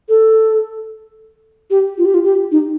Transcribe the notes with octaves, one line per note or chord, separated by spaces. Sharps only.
A4
G4
F4
G4
F4
G4
D#4